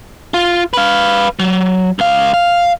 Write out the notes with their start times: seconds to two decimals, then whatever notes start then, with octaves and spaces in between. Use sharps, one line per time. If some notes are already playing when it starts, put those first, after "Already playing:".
0.34 F4
0.74 B4 F5
1.39 F#3
1.99 C#2 F5
2.34 F5